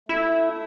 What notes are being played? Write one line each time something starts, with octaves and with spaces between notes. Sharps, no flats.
A3 E4